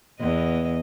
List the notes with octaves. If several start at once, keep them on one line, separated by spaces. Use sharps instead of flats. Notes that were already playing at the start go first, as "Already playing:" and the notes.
E2 B3 D#5